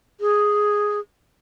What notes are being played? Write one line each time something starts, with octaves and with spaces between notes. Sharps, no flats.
G#4